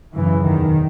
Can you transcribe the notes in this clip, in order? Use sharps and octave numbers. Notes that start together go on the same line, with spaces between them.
F#2 C#3 E3
E2 B2 D#3